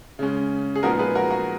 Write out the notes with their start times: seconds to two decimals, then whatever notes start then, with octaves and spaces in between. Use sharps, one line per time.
0.19 C#3 G#3 C#4
0.76 G#4
0.83 A#2 F3 G#3 B3 D#4 F#4 A#4
0.99 G#4 B4
1.15 F#4 A#4
1.30 F#4